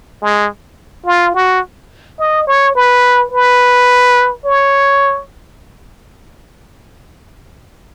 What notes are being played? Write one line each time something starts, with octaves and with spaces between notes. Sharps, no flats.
G#3
F4
F#4
D#5
C#5
B4
B4
C#5